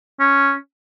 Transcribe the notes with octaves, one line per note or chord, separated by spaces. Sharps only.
C#4